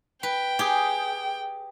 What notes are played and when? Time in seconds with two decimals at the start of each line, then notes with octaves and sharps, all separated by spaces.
0.23 B4 G5
0.59 G4 G#4